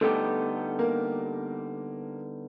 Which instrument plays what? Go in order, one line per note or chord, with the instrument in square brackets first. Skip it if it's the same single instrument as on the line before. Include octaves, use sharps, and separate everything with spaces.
[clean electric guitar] D3 G3 B3 D#4 G4 [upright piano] A3 A4
[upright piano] A#3 A#4